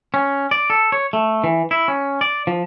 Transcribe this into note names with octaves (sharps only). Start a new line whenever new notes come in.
C#4
D5
A4
C#5
A3
E3
E4
C#4
D5
F3